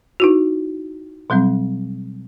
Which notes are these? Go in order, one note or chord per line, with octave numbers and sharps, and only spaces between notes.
D#4 E4 F#4
B2 F#3 G3 C4